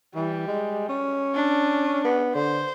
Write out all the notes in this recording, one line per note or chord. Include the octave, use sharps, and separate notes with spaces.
E3 G3
G#3
C#4
D4
B3
D3 C5